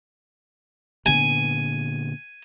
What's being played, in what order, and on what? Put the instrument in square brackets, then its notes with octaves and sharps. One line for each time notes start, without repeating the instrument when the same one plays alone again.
[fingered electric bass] A#2 D3 B3 [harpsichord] G#5